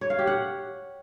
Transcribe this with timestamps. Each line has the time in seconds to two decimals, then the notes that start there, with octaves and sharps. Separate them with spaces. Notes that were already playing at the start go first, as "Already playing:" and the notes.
0.01 C#5
0.10 F5
0.19 G4
0.27 F#5